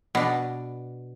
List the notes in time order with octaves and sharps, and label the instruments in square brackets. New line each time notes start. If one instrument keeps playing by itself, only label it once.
[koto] B2 D4